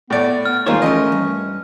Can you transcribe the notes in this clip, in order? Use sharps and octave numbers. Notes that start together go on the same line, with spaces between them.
A2 B3 D5
B3 F6
D#3 G3 G#3 A#3 F4 C5 C#5
E3 A3 C#4 A#4 D#5
G2